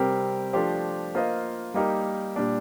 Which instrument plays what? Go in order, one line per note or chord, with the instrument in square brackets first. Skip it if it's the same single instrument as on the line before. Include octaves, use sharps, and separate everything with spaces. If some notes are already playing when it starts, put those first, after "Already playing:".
Already playing: [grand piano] C3 G3 C4 G4 A#4
F3 A3 D4 G4 C5
A#3 F4 C5 D#5
G3 A#3 D#4 G4 A#4
A#2 G3 D4